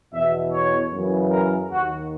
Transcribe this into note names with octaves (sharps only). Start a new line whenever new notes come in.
E2 B2 E5
C#5
F#2 C#3 E3
A#4
D#2 D#3 F#4